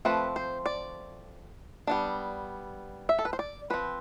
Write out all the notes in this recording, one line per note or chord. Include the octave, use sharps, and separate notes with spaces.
F3 A3 C4 B4
C5
D5
G3 B3 D4
E5
A4
B4
C5
D5
F3 C4 B4